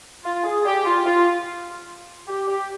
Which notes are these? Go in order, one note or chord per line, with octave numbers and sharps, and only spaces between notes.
F4
G#4
G4
F4
F4
G4
G4